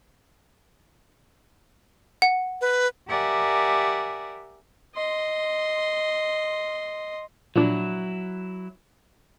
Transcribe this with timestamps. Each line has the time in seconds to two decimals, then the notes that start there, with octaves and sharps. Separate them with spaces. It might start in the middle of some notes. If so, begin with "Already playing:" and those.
2.22 F#5
2.61 B4
3.08 G4 A#4 D5 E5 F#5 G#5
4.95 D#5 C6
7.56 A#2 F3 F#3 D4 E4